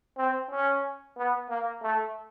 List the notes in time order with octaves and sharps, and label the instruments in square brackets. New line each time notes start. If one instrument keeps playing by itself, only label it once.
[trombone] C4
C#4
B3
A#3
A3